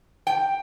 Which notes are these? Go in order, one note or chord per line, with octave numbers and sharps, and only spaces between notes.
G5